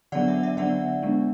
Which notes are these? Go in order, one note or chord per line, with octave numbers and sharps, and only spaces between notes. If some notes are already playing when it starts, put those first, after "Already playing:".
D3 F#3 B3 D4 D5 F#5
E5
E5
D3 F#3 B3 D4 D5 F#5
G#3 B3 D4